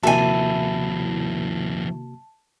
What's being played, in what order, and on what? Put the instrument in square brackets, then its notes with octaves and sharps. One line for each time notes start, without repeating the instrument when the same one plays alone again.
[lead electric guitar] D#2 F3 [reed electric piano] C3 A#3 F#4 [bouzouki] E4 G#5 [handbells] A5